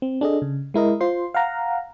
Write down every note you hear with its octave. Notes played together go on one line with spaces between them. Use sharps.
C4
D4 G#4 A4 D#5
C#3
G#3 E4 A#4 D#5
F4 C5 C6
F5 F#5 A#5